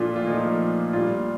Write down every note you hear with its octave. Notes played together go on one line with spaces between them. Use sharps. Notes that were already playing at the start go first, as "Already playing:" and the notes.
Already playing: A#2 F3 A3 D4 F4
F4
A#2 F3 A3 D#4
A#2 G3 D4 F4